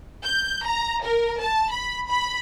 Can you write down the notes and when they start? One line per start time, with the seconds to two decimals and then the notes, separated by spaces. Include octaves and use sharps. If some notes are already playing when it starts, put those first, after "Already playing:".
0.24 G6
0.65 A#5
1.03 A#4
1.41 A5
1.71 B5
2.08 B5